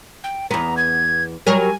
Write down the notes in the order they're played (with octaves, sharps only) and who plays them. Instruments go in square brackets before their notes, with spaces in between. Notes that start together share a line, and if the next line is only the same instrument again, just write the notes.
[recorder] G5
[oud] E2 B3 [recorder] A#5
[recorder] G#6
[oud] F#3 G3 A#4 [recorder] G#5